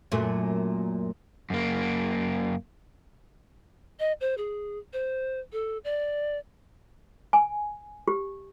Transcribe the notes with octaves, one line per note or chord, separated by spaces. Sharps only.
F#2 A#2 A3
F#2 A#3
D#5
C5
G#4
C5
A4
D5
G#5
G4